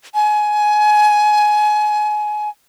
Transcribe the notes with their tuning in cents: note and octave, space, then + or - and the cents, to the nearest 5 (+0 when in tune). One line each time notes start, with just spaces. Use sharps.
G#5 +25